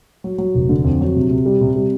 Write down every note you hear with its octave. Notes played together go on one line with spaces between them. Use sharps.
F#3
F#3
F1
D3
F2
F#3
C3
C3
G3
C3
G3